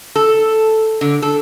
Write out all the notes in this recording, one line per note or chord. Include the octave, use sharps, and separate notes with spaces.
A4
D3
A4